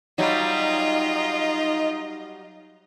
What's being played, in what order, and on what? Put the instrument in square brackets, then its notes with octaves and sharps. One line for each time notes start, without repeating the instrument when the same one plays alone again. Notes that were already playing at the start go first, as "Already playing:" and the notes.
[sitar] F#3 G3 [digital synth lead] D#4 [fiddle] F4 [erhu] D#5